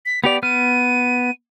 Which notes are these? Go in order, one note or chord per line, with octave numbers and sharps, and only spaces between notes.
B6
B3 G4 D5 F7
B3 F6 D#7